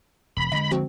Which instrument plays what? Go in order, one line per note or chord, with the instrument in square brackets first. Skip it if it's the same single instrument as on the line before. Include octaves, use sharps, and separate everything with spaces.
[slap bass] E1 [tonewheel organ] B5
[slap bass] D3 G3 G#3 [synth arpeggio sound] D#5
[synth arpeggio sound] F3 C4 F#4